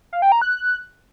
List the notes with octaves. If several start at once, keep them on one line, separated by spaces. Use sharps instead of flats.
F5
G5
A#5
F#6